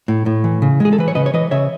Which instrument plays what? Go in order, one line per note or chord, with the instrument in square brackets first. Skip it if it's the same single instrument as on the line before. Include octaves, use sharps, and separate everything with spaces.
[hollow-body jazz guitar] A2
A2
E3
C#3
G#3
G#4
A4
E3 B4
C#5
C#3 B4 D#5
C#5
E3 B4 D#5
C#3 C#5 E5